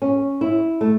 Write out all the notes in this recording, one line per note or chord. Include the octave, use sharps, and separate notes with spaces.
C#4
E4
A3